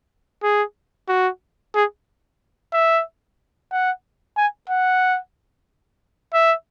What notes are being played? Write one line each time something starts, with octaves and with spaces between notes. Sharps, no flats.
G#4
F#4
G#4
E5
F#5
G#5
F#5
E5